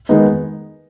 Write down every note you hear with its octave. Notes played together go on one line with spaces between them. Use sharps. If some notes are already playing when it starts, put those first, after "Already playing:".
D#3 G#3 B3 D#4